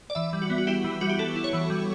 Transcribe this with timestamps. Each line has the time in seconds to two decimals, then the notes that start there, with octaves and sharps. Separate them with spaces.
0.10 D5
0.15 E3 E5
0.33 G3
0.42 F#4
0.50 B3
0.58 F#4
0.67 E4 G4
0.84 E3
1.01 G3 F#4
1.09 G4
1.19 B3 A4
1.36 E4
1.44 C#5
1.53 E3
1.70 G3